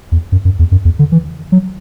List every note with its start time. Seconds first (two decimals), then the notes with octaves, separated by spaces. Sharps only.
0.12 E2
0.32 F#2
0.45 F#2
0.59 E2
0.72 F#2
0.85 E2
0.99 D3
1.12 E3
1.52 F#3